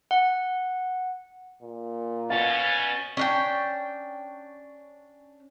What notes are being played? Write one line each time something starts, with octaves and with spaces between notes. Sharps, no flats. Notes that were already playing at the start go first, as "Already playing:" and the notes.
F#5
A#2
B2 C#4 F5 A6
C#4 D4 G5